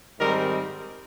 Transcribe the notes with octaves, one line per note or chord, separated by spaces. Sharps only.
G#2 D#3 G3 C4 A#4